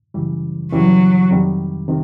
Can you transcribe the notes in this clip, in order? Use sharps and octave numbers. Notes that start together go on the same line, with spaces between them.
F#2 C#3 E3 G3
F#2 C#3 E3 F#3 G3
F2 C3 D#3 G3
C3 D#3